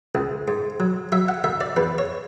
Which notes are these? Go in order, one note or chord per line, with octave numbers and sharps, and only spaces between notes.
C#2
G#2
F#3
F#3 E5
F#5
D2 E5
D5
E2 B4
C#5